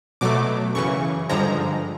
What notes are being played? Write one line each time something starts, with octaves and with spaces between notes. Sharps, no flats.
B2 F#3 A3 D6
F#2 C#3 E3 C#6
G2 D3 F3 G#3 A#5